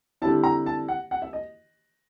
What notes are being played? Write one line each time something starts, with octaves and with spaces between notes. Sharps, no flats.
D3 G3 C4 E4 A5
A#5
A5
F#5
F#5
E5
D#5